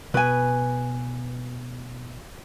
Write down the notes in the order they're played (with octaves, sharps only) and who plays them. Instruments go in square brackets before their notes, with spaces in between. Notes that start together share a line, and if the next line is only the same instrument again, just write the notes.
[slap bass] B2 [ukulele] B4 G#5